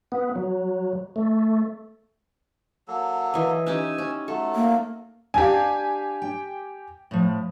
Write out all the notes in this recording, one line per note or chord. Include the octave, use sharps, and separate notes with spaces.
B3
F#3
A3
F#3 A#3 A4
E3 D#5
C#4 D#4 G4 G#5 E6
C#4
F#3 A3 A4
A#3
D4 G4 F5 G#5
G5
A2 F3